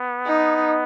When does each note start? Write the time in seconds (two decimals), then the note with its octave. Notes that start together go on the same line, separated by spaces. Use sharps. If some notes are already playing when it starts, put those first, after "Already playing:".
Already playing: B3
0.27 D#4